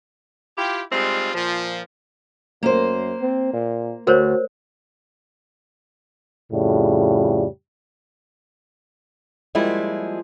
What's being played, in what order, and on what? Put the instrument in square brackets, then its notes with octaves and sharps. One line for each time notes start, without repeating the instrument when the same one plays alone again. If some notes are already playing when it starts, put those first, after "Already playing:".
[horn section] E4 F4 G4
G3 G#3 C4 D#4 F4
A#2 F3
[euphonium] F#2 [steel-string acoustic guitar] A#3 C5
[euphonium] C4
A#2
[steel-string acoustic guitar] D2 [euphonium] F#4 [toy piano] A#4 C5 C#5
[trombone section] F2 A2 C#3 G3
[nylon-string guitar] F3 G3 G#3 A#3 E4 F4